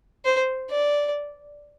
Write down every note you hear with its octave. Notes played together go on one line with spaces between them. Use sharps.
C5
D5